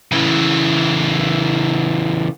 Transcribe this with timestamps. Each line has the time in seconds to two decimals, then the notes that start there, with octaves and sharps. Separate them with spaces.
0.12 C#3 E3